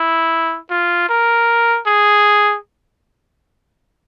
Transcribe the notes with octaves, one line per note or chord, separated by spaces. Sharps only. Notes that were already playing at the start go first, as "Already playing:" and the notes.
Already playing: E4
F4
A#4
G#4